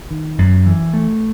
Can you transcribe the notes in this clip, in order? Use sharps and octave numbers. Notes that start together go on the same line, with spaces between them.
D#3
F#2
E3
A3